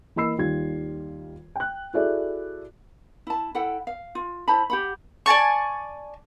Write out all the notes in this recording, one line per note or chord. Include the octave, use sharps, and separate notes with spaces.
E3 A#3 D#5 B5 E6 C7
D#2 G3 F4 G#6
G5 F#6
E4 F#4 G#4 A4 D5 E5
E4 A5
E4 A4 F#5 G5
F5
F4
E4 C5 A5 B5
G4 F#5 B5
D5 G#5 A5 C#6